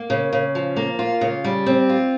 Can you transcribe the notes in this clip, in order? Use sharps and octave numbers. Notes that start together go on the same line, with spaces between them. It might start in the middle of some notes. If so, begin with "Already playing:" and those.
Already playing: A#3
C#3
C#3
F3
A#3
F4
C#3
G3
C4
F4